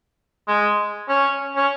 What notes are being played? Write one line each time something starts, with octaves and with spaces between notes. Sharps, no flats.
G#3
C#4
C#4